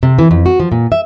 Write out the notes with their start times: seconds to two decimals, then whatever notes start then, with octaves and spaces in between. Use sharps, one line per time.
0.03 C3
0.19 E3
0.31 F2
0.46 F#4
0.60 F3
0.72 A#2
0.92 E5